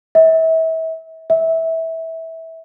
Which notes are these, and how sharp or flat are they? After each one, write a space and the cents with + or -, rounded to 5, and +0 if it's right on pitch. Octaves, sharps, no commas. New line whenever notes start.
E5 -35
E5 -20